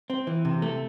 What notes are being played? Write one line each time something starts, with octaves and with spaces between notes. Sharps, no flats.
C4
E3
C3
A3